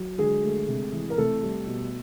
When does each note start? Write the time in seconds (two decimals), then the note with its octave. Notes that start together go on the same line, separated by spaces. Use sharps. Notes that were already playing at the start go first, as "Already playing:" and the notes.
Already playing: F#3
0.18 D3 G#3 G#4
0.43 A3
0.68 C3
0.93 E3
1.10 A#4
1.18 C3 A3 A4
1.43 G3
1.67 B2